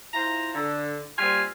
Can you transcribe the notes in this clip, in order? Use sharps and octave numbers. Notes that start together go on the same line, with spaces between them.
E4 F4 C5 A#5
D3
G3 A#3 C4 F4 G4 G#5